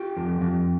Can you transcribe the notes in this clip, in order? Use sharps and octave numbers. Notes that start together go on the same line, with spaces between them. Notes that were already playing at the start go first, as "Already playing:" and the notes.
Already playing: F4 G4
F2
F2